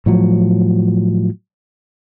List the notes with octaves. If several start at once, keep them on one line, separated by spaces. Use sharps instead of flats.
A2 F3 F#3